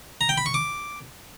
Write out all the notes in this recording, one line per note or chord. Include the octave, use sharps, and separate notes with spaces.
A#5
G5
B5
C#6
D6